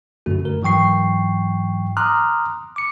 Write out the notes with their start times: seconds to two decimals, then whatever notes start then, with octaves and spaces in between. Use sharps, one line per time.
0.26 F#2 D3 A3 F#4
0.45 A#4
0.62 G#2 E3 F#3 G5 C#6 C7
1.97 A#5 C6 D6 D#6 F6 F#6
2.76 D6 C#7